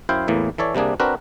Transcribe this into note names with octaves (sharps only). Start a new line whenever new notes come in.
F#2 E4 C5 F5 G5
E2 A2 E3 A#3
E3 A4 C#5 D5
C3 G3 A#3 D4 G#4
C4 D4 F#4 A#4 B4